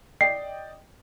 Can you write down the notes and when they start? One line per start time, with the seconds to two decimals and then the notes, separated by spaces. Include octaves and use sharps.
0.21 D5 D#5 G5 C7